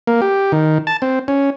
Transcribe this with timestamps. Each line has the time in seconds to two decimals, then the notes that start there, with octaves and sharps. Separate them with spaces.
0.07 A#3
0.22 G4
0.52 D#3
0.87 A5
1.02 C4
1.28 C#4